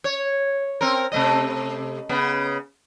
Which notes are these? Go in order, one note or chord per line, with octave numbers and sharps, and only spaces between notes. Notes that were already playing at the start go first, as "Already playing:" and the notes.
C#5
C4 A#4
C3 A3 D#5
C#3 B3